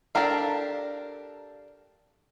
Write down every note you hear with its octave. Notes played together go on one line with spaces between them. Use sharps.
D4 G4 A4 A#4 F5